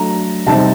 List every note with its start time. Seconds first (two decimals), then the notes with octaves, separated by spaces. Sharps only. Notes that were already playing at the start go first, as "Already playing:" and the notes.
Already playing: F#3 A3 D4 A#5
0.47 C3 G3 C4 D#4 A5